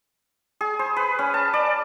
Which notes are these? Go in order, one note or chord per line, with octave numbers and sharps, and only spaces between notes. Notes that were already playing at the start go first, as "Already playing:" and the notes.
G#4
C5
B4
C#4
A5
D5